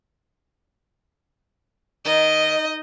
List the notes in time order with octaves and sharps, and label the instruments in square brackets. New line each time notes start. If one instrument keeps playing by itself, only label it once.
[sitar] D#3 [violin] D#5